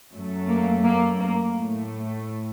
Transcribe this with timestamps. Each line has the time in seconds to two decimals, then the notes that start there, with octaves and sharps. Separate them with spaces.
0.12 F#2 F#3 A3
0.48 A#3
0.83 A#3
1.19 A#3
1.56 A2 A3